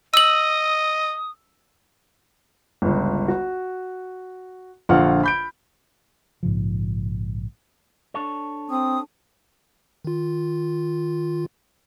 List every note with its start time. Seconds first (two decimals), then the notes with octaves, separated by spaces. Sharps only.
0.14 D#5 D#6 E6 F#7
2.82 G1 C#2
3.28 F#4
4.89 A#1 D3 F4 F#5 F6
5.23 B5 G6 D7
6.43 A#1 G#2 C#3 F3
8.14 D4 A4 C#5
8.70 C4 D#6
10.05 D#3 F4